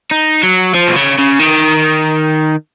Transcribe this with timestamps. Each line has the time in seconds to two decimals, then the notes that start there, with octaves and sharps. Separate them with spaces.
0.11 D#4
0.43 F#3
0.75 F3
0.88 B2
0.96 C#3
1.18 C#3
1.39 D#3